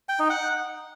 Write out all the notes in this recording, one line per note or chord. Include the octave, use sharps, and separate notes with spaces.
G5
D#4
F#5